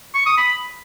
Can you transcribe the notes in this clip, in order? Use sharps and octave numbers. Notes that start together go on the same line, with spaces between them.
C#6
D#6
B5